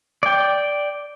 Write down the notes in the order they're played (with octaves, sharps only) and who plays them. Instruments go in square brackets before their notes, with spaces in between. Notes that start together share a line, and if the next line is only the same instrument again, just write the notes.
[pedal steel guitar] D5 G5